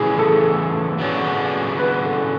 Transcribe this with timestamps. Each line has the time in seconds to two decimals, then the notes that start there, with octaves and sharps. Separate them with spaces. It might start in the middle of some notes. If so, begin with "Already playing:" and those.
Already playing: C#3 E3 A3 E4 G#4
0.19 A4
0.98 C#3 F#3 B3 D4
1.79 B4
2.06 A4